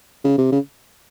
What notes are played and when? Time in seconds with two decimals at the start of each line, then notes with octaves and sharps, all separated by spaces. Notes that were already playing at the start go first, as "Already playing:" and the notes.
0.24 C#3
0.38 C3
0.52 C#3